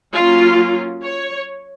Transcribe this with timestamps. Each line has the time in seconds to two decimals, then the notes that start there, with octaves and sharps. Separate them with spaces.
0.14 F#3 A#3 C#4 F4
1.03 C#5